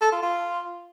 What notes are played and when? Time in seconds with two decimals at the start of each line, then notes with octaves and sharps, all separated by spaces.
0.02 A4
0.12 F4
0.23 F4